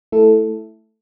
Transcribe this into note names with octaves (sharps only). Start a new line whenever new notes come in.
A3 E4 A4